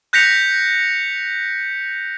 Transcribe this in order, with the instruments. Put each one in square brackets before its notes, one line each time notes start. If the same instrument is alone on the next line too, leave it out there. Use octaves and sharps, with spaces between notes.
[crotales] F#6 G6 A#6 B6 C#7 F7